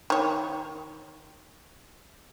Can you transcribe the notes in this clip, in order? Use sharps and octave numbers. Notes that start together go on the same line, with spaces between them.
D#3 C#5